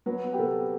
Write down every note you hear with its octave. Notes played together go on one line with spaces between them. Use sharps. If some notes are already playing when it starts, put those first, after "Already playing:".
F#3 B4
B3
G4
C3 A4